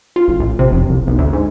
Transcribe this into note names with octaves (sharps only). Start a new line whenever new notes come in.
F4
A1
A1
C3
F1
C2
B1
D2
G#2